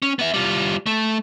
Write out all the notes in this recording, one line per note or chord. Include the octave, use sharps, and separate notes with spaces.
C#4
B3 E5
G3 F4
A3